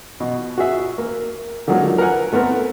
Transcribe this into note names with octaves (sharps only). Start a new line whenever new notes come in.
B2
F#4 G#4 E5
A#3
D3 F3 F#3 G#3 A#3 D#4
A#4 B4 F#5 G#5
A3 B3 C4 A#4